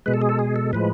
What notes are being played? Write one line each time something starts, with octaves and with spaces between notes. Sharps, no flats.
B2 G#3 B4
A4
G#4
A4
G#4
A4
A2 F3 G#3 B4